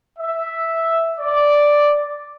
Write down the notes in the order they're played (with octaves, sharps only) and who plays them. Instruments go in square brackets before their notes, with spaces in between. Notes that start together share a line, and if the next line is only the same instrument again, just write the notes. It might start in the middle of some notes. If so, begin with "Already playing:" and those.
[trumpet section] E5
D5